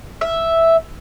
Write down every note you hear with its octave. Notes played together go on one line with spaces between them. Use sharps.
E5